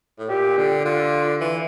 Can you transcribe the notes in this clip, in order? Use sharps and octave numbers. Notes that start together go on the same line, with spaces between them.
A2
A#2 G4
D3
D3 F4
E3